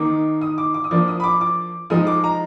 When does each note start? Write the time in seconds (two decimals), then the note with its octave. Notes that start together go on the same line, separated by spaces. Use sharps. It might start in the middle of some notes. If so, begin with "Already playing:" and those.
Already playing: D#3 A#3 D#4 D6
0.41 D#6
0.58 D6
0.74 D6
0.84 D#6
0.91 F3 A#3 D4 D6
1.08 D#6
1.20 B5
1.24 D6
1.41 D6
1.90 F3 G#3 D#4 D#6
2.07 D6
2.24 A#5